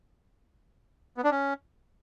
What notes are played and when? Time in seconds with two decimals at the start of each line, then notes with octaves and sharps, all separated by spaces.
1.17 B3
1.24 D4
1.31 C#4